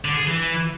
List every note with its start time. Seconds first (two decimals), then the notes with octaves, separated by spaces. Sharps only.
0.05 D3
0.16 G#4
0.27 E3